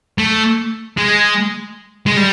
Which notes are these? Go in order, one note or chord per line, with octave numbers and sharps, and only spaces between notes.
A3
G#3
G#3
G3